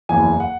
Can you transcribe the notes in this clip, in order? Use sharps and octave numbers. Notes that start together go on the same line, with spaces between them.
F#1 E2 E3 G#5
F#5